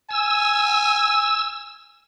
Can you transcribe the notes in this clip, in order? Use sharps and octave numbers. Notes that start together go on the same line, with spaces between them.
G#5 E6